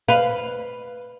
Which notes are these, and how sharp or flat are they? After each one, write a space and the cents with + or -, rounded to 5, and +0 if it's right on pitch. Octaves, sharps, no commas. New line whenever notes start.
B4 +0 F5 +0